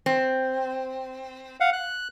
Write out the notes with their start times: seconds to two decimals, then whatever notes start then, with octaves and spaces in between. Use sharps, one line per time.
0.06 C4
1.60 F5 F#5
1.73 F#6